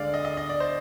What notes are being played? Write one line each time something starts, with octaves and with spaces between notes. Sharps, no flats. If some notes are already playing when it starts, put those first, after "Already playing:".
Already playing: D2 D3 G#3 D5 F5
D#5
D#5
D#5
D5
C5